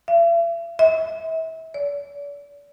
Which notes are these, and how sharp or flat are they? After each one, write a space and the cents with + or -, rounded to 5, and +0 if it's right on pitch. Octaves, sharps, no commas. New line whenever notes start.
E5 +45
E5 -35
D5 -40